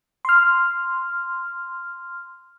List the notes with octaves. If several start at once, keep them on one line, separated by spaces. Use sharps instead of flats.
C6 F6